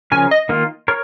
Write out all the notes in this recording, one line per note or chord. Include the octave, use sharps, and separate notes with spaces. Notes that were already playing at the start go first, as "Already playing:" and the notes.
C#3 F3 C#4 A#4 C#5 G#5
D#5
D#3 A#3 F4
A#4 C#5